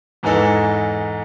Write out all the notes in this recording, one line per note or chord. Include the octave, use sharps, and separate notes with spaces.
E2 G#2 E3 D#4 A4